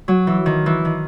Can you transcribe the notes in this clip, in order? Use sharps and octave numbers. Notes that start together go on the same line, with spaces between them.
F#3
E3
D#3
E3
D#3